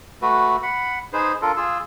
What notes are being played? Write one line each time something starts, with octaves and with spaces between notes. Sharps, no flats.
A3 F#4 B4
F#5 B5
D#4 G#4 B4 C5
D4 F4 A4 A#4
F4 G#4 E6